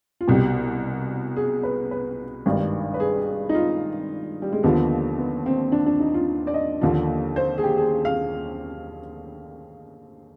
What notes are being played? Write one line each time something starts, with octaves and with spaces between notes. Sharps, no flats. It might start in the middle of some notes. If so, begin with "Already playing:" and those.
F4
C2 B2 G4
G#4
B4
B4
G#1 G2 D#3
B4
G#4
D#4
F4
G3
G#3
D#2 D3 F3 B3
B3
C4
D4
D4
D#4
F4
D5
D#5
D#2 D3 F3
C5
G#4
G4
G#4
F5